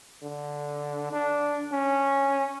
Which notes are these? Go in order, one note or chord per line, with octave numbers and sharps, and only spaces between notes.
D3
D4
C#4